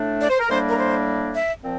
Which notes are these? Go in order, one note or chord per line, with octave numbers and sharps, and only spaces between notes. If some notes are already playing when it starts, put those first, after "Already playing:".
Already playing: A2 A3 D4
D5
C5
A#4
A2 G3 A#3 D4 C5
A#4
C5
E5
A#2 F3 C4